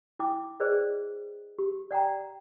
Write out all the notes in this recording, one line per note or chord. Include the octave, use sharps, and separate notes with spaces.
E4 G5 D6
G#4 B4 C5 D5 D#5
G4
D5 F#5 G5 A#5